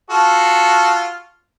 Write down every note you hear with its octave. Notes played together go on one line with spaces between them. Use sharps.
F4 F#4 A4